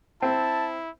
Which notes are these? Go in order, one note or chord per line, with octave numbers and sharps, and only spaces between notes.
C4 E4 A5